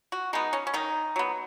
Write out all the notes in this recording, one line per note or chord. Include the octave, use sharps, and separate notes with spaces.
F#4
G#3 B3 D#4
C#4
C#4
D#3 D#4
F#3 B3